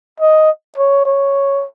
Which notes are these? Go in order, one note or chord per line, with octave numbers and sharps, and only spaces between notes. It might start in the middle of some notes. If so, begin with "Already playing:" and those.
D#5
C#5
C#5